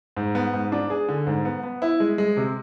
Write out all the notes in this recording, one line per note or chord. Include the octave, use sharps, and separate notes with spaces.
G#2
B3
G#2
D4
G#4
D3
G#2
B3
B3
E4
G#3
G#3
C3